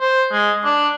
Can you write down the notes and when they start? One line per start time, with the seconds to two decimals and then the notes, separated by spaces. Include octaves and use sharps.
0.01 C5
0.32 G#3
0.65 D4